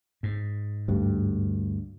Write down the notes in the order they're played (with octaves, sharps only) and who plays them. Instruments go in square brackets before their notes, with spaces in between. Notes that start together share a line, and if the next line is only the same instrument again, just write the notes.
[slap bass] G#2
[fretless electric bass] D2 G2